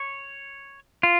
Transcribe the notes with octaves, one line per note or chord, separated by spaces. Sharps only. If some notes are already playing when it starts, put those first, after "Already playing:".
Already playing: C#5
F4